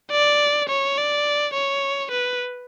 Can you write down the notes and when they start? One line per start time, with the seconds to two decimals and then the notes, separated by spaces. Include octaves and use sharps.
0.11 D5
0.69 C#5
0.98 D5
1.54 C#5
2.11 B4